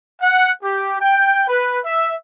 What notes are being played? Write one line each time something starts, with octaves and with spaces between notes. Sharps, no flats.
F#5
G4
G5
B4
E5